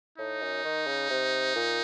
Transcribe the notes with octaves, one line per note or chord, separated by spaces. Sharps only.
A2 D#4
F#2
D#3
C#3
C3
A#2